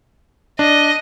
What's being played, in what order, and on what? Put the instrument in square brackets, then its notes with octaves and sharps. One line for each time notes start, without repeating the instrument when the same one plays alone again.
[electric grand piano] D4 [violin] D#5